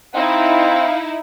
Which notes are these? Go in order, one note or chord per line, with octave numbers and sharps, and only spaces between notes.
C4 D#4 E4 F5